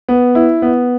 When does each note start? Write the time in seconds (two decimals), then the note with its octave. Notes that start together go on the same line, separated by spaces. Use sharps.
0.09 B3
0.35 E4
0.62 B3